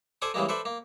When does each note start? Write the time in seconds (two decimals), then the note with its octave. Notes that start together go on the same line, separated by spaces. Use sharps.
0.22 A4 C5 D5 G#5 D6 D#6
0.34 C#3 E3 G3 G#3 A#3
0.49 A4 B4 C5 D5 E5
0.65 A#3